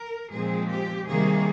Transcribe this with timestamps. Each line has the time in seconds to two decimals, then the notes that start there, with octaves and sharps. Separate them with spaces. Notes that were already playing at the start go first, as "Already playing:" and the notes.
Already playing: A#4
0.31 A#2 F3 G#3 C4 G#4
0.69 G4
1.07 C3 D#3 G3 A#3 G#4